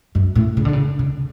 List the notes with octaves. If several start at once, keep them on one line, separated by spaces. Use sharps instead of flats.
F#2
A2
C#3
D3
C#3
C#3